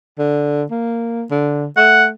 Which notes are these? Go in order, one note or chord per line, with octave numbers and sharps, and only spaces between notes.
D3
A#3
D3
A3 F#5